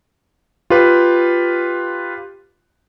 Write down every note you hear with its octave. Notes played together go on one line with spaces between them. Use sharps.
F4 G4 B4